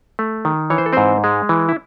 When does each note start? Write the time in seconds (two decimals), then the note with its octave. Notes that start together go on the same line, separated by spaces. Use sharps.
0.19 A3
0.45 D#3
0.70 E3 C#5
0.78 C5
0.86 A4
0.93 G#2 C4 C5
1.24 G#3
1.49 E3
1.69 E4